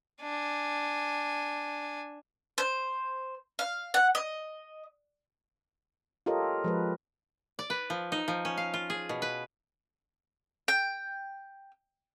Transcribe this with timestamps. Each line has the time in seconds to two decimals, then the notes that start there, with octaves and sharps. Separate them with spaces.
0.22 D4 G#5
2.58 C5
3.59 F5
3.94 F#5
4.15 D#5
6.26 F4 G4 A4 A#4 C#5 D#5
6.64 F3 G#3 B4
7.59 D5
7.70 B4
7.90 F3
8.12 D#4
8.28 F3
8.45 C#4
8.57 F5
8.74 F4
8.90 G#4
9.09 B2
9.22 B4
10.68 G5